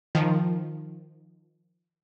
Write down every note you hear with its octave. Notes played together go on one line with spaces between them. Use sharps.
D#3 F3